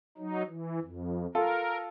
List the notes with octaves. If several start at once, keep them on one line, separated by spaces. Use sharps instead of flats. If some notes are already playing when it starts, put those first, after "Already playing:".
F#3 D#4
E3
F2
F4 A4 A#4